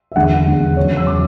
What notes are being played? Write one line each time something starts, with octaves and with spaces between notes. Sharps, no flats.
E5
E2 D3 G#3 F#5
E2 D3 G#3
E2 C#3 F#3 C#5
E6
C#3 F#3 D6